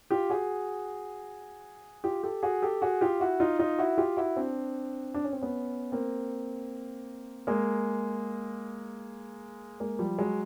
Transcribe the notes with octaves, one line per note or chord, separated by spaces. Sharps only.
F4 G4
F#4 G#4
F4 G4
G4 A4
F#4 G#4
G4 A4
F#4 G#4
F4 G4
E4 F#4
D#4 F4
D#4 F4
E4 F#4
F4 G4
E4 F#4
C4 D4
D4
C#4
C4
B3 C#4
A#3 C4
G#3 A#3
G#3 A#3
F3 G3
F#3 G#3